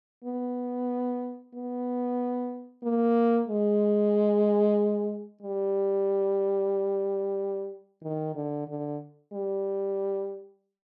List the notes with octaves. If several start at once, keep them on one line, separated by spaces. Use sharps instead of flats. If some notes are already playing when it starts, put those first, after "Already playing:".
B3
B3
A#3
G#3
G3
D#3
D3
D3
G3